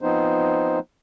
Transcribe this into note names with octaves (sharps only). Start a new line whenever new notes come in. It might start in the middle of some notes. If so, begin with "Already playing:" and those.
F3 B3 C4 D#4 C5